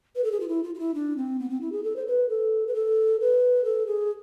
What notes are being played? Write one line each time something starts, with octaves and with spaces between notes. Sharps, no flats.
B4
A4
G#4
F4
E4
F4
F4
E4
D4
C4
B3
C4
E4
G#4
A4
C5
B4
A4
B4
A4
B4
A4
G#4